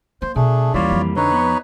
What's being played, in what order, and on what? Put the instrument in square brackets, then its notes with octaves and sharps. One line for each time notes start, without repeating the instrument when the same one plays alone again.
[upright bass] A#3 [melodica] C5
[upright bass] B2 [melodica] A3 D4 G#4
[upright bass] D#2 C#4 [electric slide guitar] E3 G3 A#3 [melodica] F4 C#5 D5
[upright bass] F2 F3
[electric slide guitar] D3 [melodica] D#4 B4 C#5
[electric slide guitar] B3